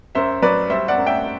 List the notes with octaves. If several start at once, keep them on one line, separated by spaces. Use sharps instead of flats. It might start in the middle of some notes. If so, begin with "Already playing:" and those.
F#2 C5 E5
F#3 B4 D5
G3 C5 E5
D5 F#5
F#2
E5 G5